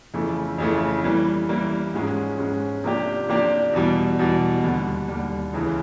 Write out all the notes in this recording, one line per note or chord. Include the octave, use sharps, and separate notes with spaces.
F2 C#3 E3 A3
F2 C#3 E3 A3
E3 G3 A#3
E3 G3 A#3
G#2 F3 G#3 C#4
G#2 F3 G#3 C#4
C3 F3 A#3 D4 G4
C3 F3 A#3 D4 G4
E2 B2 G3
E2 B2 G3
D#2 D3 G3
D#2 D3 G3
C#2 C#3 E3